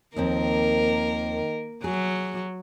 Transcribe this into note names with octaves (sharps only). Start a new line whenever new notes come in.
D#2 D#3 F3 A#3 C4 A#4
F#3 G#4